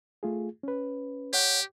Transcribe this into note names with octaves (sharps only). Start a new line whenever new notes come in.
A3 F4 G#4
C#4 B4
G4 C#5 F#5 G6